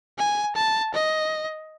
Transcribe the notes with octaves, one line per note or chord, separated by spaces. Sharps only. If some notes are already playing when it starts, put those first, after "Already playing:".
G#5
A5
D#5